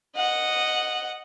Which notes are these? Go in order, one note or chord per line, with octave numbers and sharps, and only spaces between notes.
D#5 F#5